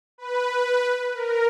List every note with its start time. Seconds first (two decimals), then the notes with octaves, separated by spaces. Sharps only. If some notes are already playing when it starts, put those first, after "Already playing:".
0.18 B4
1.13 A#4